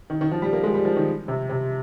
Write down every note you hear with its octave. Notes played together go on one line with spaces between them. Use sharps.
D#3
D#3
F3
G3
A#3
G#3
G3
F3
D#3
C3
C3